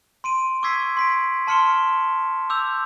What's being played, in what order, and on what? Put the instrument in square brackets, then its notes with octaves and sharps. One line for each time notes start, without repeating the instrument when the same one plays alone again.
[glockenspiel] C6 D7 D#7
C#6 D6 E6 G#6 B6 C7
C6 B6 D7
A5 C6 F6 C#7 E7 G7
D6 E6 G6 F7